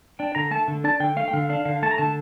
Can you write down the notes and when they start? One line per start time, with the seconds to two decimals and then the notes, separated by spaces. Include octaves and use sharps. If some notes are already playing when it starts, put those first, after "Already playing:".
0.19 D4 G5
0.35 D3 A#5
0.51 A3 A5
0.68 D3
0.84 D4 A5
1.00 D3 G5
1.16 A3 F5
1.28 G5
1.33 D3 F5
1.49 D4 F5
1.65 D3 F5
1.83 A3 A5
1.91 A#5
1.98 D3 A5